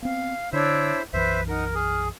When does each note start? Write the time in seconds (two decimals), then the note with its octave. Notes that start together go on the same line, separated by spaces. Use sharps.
0.02 B3 C4 F5
0.53 D3 D4 E4 C5 C#5 E5 E6
1.13 B1 F#2 E3 B4 C5 E5
1.48 D#4 A#4 F#5 F6
1.75 G#4 F6